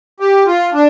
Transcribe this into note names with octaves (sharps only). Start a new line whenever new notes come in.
G4
F4
D4